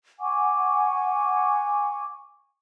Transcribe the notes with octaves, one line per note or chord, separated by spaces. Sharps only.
F#5 G#5 C#6 D6